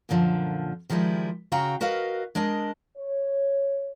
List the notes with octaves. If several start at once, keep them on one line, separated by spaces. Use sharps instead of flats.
F#2 A#2 D3 F3
D#3 F3 G3 G#3 E4
C#3 F#4 F5 G5 A#5
F#4 A#4 B4 D#5 F5
G#3 D4 A#4 D#5
C#5